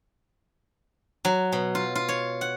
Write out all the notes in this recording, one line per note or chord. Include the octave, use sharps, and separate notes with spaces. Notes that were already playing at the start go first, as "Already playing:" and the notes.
F#3
B2
F4
F4
C#5
F#5